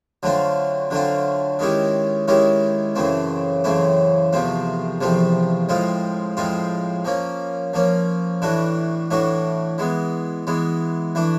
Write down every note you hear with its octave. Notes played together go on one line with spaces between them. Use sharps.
D3 F#3 A3 C4 F4
D3 F#3 A3 C4 F4
D#3 G#3 C#4 E4 G4
D#3 G#3 C#4 E4 G4
F#2 C#3 E3 A3 C4
F#2 C#3 E3 A3 C4
E2 C3 F3 A3 C4
E2 C3 F3 A3 C4
A2 F3 G#3 C4 F4
A2 F3 G#3 C4 F4
F3 A#3 C#4
F3 A#3 C#4
A2 E3 A3 D4 F#4
A2 E3 A3 D4 F#4
E3 G#3 B3
E3 G#3 B3
E3 A3 D4